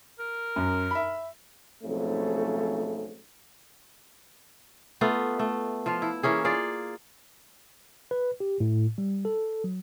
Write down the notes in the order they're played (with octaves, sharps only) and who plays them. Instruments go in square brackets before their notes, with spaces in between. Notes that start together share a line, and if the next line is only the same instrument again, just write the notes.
[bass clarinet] A#4
[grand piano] F#2
E5 B5
[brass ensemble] B1 F2 G#2 C#3 A3
[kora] A3 B3 F4
A3
F3 F4
E4
E3 A#3 C#4 G#4
F4 G#4 D5
[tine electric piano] B4
G4
A2
G3
A4
F#3